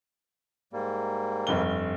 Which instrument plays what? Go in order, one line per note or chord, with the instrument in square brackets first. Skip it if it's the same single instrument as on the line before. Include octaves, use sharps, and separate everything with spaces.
[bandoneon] G#2 G3 A#3
[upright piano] F1 G2 G7